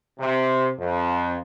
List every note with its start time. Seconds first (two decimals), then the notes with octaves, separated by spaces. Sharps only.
0.18 C3
0.78 F2